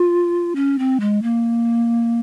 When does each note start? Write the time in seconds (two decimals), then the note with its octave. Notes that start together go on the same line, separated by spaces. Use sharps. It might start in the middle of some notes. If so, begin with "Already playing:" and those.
Already playing: F4
0.55 C#4
0.79 C4
1.00 G#3
1.23 A#3